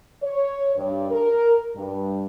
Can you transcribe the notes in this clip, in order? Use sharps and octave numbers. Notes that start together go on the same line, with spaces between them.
C#5
G2
A#4
G2